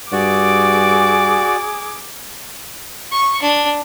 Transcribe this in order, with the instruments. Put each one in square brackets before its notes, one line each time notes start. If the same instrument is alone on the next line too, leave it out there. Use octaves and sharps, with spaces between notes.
[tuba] G2 [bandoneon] F#4 D5 [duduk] G#4 [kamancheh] D6
[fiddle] C#6
D4